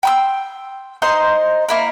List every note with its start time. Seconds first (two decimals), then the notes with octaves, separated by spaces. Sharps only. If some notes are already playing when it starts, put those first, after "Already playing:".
0.03 G5 C6 E6
1.02 D#4 C5 D#5 C6
1.69 A#3 E4 A#4